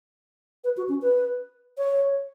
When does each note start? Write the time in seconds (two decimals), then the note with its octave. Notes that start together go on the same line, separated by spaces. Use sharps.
0.64 B4
0.77 F#4
0.89 C#4
1.02 B4
1.78 C#5